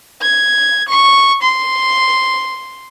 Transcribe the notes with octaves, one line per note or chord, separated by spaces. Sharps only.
G#6
C#6
C6